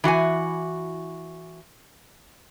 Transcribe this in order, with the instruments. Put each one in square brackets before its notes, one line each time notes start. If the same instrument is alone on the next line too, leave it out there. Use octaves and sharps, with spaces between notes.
[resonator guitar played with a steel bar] E3 F#4 F5 G#5